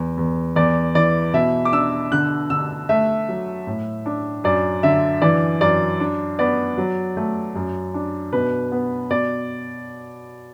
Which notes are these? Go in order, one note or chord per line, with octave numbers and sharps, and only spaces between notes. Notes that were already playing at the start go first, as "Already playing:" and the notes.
Already playing: E2
E2
E2 D5
E3 D5
B2 E5
D6
D4 E6
D3 F#6
D3 E6
A3 E5
F#3
A2
D4
F#2 D5
D3 E5
E3 D5
F#2 D5
D4
B3 D5
F#3
A3
F#2
D4
B2 B4
B3
B2 D5